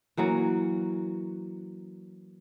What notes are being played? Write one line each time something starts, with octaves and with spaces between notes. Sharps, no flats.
E3 F#3 A#3 C#4